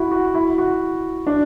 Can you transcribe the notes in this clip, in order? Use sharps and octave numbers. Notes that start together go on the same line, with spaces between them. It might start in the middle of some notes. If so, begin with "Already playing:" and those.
Already playing: E4 F#4
F#4
E4
F#4
D4